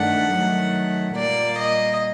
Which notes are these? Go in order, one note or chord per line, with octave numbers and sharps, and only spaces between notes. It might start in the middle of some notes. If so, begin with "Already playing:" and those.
Already playing: G2 D#3 A3 D4 F#5
D#3 F#3 A3
A#2 G3 A#3 D5
D#5